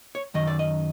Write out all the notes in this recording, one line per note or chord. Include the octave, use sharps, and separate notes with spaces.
C#5
F#2 D#3 D#5
D5
D#5